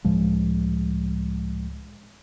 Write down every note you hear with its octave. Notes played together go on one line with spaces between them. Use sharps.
C#2 A2 F3 G#3